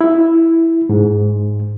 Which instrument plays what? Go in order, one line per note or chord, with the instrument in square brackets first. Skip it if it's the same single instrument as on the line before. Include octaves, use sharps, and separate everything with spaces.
[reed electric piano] E4
G#2